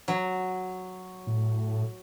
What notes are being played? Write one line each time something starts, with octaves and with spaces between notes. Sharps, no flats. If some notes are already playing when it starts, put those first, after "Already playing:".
F#3
A2